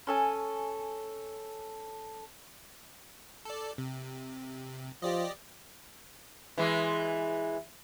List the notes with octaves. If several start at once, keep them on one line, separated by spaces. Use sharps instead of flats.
C#4 A4 G#5
A4 D5
C3
F3 G4 D5 D#5
E3 G#3 E4